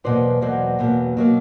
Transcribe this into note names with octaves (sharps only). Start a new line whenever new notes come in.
E2 B2 F#3 A#3 C5 D5
E2 B2 F#3 A#3 C5 D5
E2 B2 F#3 A#3
B2 F#3 A#3